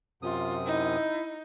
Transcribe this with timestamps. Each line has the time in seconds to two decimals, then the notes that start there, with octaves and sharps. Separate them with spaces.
0.22 F#2 C3 F4 D#6
0.66 D#4 E4